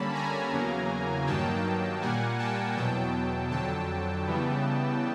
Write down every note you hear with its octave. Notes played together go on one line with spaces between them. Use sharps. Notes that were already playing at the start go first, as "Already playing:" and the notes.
Already playing: D3 G3 A#3 C#4 A5 B5
G#5 A#5
E2 C#3 F#3 A#3
G2 D#3 F#3 A#3 G5 A5
A#2 G3 A#3 F#5 G#5
G5 A5
E2 B2 F#3 G5 A5
F2 D3 F#3 G5 A5
C#3 E3 G3 B3